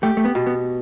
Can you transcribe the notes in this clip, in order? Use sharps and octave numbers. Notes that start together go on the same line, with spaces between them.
A3 G4
A3
B3
B2
B3